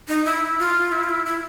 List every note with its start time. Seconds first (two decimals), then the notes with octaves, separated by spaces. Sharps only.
0.08 D#4
0.25 E4
0.59 F4
0.92 E4
1.04 F4
1.09 E4
1.26 E4